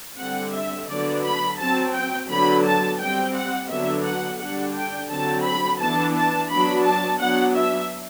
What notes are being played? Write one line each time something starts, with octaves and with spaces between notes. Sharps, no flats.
D3 G3 C4 F#5
E5
D3 F#3 B3 D4 D5
B5
F#3 C4 A5
G5
D3 F#3 B3 D4 B5
A5
G3 C4 G5
F#5
D3 F#3 B3 D4 E5
F#5
D3 G3 D4 F#5
G5
D3 F#3 C4 A5
B5
E3 B3 D4 A5
A5
F#3 B3 D4 B5
A5
F#3 B3 D4 F#5
E5